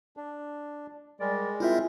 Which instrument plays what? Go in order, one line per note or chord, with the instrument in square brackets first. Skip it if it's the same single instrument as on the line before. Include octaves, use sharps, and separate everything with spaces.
[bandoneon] D4
[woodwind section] G3 A#4 D5 [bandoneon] G#3
[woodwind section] C4 A#4 C5 [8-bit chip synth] E4 F4 E5